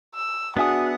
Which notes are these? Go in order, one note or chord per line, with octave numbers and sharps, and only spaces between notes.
E6
B3 D4 F#4 G#4 E5 F#5 D#6